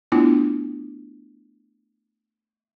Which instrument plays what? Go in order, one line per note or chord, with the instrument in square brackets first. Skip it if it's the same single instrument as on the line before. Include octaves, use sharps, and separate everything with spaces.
[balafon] A3 B3 D4 E4 F4